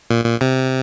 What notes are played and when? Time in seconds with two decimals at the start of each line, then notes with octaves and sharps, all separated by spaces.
0.10 A#2
0.25 A#2
0.41 C3